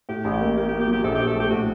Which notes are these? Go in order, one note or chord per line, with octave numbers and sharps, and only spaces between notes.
A2 G4
A1
G4
A#3
A#3 G4
G4
A#3
G4
F#3
G4
A#1 A4
A#1 G4
A4
A3 G4
A2 F#4